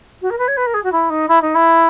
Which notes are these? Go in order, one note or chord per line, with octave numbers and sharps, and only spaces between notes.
F#4
A#4
B4
C#5
B4
A#4
G#4
F#4
E4
D#4
E4
D#4
E4